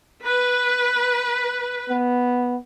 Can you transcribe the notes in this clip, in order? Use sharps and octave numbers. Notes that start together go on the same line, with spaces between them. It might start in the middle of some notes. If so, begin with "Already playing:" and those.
B4
B3